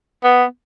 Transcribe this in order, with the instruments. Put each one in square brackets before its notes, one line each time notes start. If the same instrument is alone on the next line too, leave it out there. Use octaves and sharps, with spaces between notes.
[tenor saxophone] B3